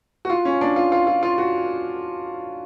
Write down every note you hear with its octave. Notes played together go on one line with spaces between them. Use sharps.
F#4
F4
C#4
D4
F4
F4
F4
F4
F#4